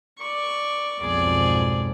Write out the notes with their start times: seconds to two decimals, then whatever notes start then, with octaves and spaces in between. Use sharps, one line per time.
0.19 D5 C#6
1.00 B1 F2 G#2 G#4 D5